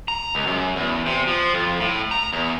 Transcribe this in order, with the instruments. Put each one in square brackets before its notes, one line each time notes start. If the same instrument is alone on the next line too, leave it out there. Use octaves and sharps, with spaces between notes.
[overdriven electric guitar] A#5
C#2
F#2
E2
C3
F3
F2
A2
A#5
E2